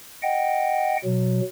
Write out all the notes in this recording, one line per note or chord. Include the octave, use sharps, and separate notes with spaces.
D#5 F#5 G5
B2 F#3